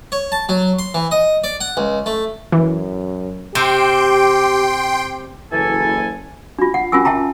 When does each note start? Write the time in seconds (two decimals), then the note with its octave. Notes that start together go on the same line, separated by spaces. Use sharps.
0.12 C#5
0.32 A5
0.49 F#3
0.79 C6
0.94 E3
1.11 D#5
1.44 D5
1.61 F#5
1.77 C#2
2.06 A3
2.52 F#2 E3
3.55 C3 G4 G5 C6 D7
5.52 F#1 E3 A4 G#5
6.58 D4 F4
6.74 F#5
6.92 C#4 F4 A#4 G#5 E6
7.05 E5 G5 A5 A#5